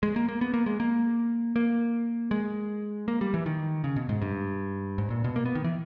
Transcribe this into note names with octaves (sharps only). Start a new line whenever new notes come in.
G#3
A#3
A#3
B3
A#3
G#3
A#3
A#3
G#3
A#3
G3
E3
D#3
C#3
B2
G#2
G2
G#2
A#2
B2
A#3
B3
D#3
E3